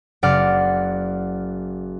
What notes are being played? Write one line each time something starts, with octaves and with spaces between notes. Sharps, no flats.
F#1 D5 F#5 F6